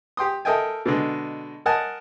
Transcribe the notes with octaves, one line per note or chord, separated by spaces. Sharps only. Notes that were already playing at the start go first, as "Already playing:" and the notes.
G4 G5 C6 D#6
A4 A#4 D#5 E5 G5 G#5
B2 D3 G#3
A#4 D#5 F#5 G#5 A5